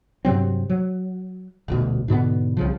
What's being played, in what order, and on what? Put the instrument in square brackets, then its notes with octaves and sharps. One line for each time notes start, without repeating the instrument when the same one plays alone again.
[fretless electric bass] G2 C3 F#3 C4
F#3
D#1 D2 B2
G#2 B2 D3 B3
C2 C#3 F3